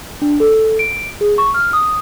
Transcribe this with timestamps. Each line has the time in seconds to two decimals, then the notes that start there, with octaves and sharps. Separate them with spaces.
0.22 D4
0.40 A4
0.79 D7
1.21 G#4
1.38 C#6
1.54 F6
1.73 D#6